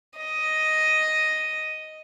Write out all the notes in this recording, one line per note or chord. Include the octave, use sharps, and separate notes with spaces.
D#5